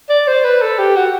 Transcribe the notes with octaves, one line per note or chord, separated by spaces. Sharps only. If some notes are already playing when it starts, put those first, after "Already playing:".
D5
C5
B4
A4
G4
F#4